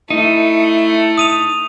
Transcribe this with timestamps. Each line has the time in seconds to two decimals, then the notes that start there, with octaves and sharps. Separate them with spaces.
0.10 A3 D#4 E4
1.18 D#6 D#7 F7